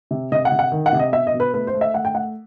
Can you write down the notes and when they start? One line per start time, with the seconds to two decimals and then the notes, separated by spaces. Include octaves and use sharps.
0.11 C3
0.32 C3 D#5
0.45 F#5
0.52 C3
0.59 F#5
0.72 D#3
0.86 F#5
0.93 C3
0.99 D#5
1.13 B2 E5
1.27 D#5
1.34 B2
1.40 B4
1.54 A3 B4
1.67 C5
1.74 A3
1.81 E5
1.94 A3 F#5
2.05 G5
2.15 A3 F#5